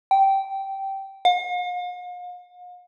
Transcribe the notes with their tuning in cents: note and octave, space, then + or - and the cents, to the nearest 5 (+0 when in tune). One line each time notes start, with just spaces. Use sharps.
G5 -15
F5 +45